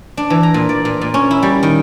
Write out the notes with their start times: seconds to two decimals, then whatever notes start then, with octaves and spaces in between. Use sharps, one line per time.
0.17 D4
0.30 E3
0.43 A#5
0.54 A#2
0.69 D5
0.85 A#2
1.01 A#2
1.14 C#4
1.31 E4
1.43 G3
1.63 D#3